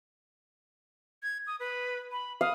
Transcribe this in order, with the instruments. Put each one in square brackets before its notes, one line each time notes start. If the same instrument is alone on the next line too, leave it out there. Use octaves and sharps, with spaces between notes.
[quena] G#6
D#6
B4
B5
[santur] F5 [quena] D#6